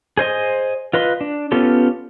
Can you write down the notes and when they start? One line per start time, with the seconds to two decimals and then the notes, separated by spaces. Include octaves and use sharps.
0.17 G#4 C5 D#5 C6
0.93 F4 B4 D#5 C6
1.21 D4
1.52 B3 C#4 F4 G4 A4